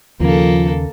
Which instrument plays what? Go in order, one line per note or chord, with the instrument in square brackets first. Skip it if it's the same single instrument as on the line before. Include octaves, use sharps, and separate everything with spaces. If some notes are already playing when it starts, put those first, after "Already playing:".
[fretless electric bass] D#2 C#3 [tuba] F3 [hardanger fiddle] A#3 A4